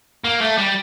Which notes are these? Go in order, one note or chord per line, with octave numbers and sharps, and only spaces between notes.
A#3
A3
G3